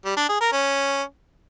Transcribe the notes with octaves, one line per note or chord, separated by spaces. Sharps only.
G3
D4
G#4
A#4
C#4